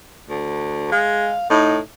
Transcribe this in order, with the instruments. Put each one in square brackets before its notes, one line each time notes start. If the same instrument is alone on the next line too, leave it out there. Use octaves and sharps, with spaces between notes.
[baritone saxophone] D2
[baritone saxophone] G#3 [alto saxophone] F5
[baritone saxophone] A2 [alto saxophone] D#4